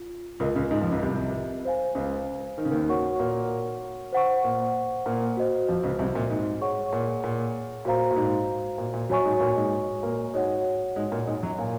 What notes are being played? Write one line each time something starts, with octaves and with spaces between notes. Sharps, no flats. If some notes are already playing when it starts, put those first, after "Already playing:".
Already playing: F4
C#2 C#3 F4 A#4 D#5
C#2 C#3
G#2 G#3
F2 F3
C#2 C#3
C2 C3
C5 F5 G#5
C#2 C#3
D#3
C#3
D#2 D#3
F#4 A#4 C#5 F#5 C#6
A#2 A#3
C5 F#5 C#6
A#2 A#3
A#2 A#3
F#4 C5 D#5
F2 F3
C#2 C#3
C2 C3
A#2
G#2
G#4 C#5 F#5 C#6
A#2
A#2
A#2 F#4 C5 F5 A#5
A#2
G#2
A#2
A#2
F#2 F#3 F#4 C#5 G#5 C#6
G#2 G#3
A#2 A#3
G#2 G#3
A#2 A#3
G#2 G#3 F#4 C#5 F#5
G#2 G#3
A#2 A#3
G#2 G#3
F#2 F#3
A#2 C#5 F5 G#5